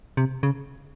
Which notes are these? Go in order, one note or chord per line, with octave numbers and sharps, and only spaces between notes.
C3
C#3